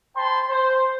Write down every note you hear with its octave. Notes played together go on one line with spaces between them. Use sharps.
C5 G5 A5 B5 C6
C5